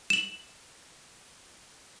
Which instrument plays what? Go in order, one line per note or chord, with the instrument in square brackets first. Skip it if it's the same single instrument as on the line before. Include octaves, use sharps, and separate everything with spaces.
[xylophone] E7 F#7